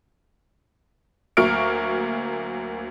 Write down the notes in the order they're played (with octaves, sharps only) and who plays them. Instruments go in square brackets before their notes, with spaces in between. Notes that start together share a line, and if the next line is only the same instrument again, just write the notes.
[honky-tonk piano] D2 F#3 A#3 C#6 F6 D7